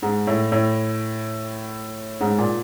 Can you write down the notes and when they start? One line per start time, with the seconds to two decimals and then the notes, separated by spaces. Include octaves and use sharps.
0.02 G#2
0.27 A2
0.52 A2
2.21 G#2
2.38 A#2